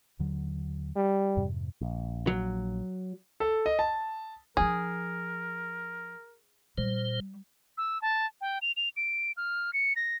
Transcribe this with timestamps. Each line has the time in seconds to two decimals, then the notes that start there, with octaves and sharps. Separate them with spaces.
0.19 D#2 D3 F#3
0.96 G3
1.37 F2 G#2 C3
1.81 A#1
2.27 F#3
3.40 A4
3.66 D#5
3.79 A5
4.57 F3 D4 G#4 A#4
6.78 A#2 G3 C5
7.78 E6
8.02 A5
8.41 G5
8.62 F7
8.77 F7
8.97 D7
9.37 F6
9.73 C#7
9.96 A#6